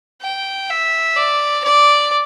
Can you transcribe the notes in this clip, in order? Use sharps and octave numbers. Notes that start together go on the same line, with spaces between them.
G5
E5
D5
D5